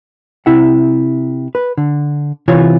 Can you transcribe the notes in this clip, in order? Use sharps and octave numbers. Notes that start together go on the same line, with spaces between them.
C3 E4 F#5
B4
D3
C3 E3 F4 C#5